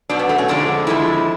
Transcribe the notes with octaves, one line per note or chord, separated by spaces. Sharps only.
B2 F#3 D4
B3
A3
C#4
F2 D3 F3 G#3 D4
F2 D3 F3 G#3 E4